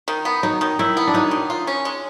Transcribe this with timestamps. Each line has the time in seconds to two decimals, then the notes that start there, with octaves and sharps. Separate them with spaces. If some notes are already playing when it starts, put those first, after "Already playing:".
0.08 D#3
0.25 B3
0.43 F#3 D#4
0.61 D#3
0.79 D#3 E4
0.97 B3
1.07 D4
1.14 F#3 D#4
1.31 D#3
1.50 F4
1.67 C#4
1.85 G#3